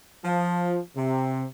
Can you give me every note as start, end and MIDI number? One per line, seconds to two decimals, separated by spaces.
0.23 0.78 53
0.96 1.44 48